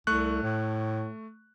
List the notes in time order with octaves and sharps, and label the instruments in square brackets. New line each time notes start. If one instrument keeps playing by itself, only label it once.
[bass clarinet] C2 [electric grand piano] A3 C#6 F#6
[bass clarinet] A2